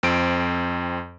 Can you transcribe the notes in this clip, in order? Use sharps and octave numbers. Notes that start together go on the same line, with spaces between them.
F2 C4 D7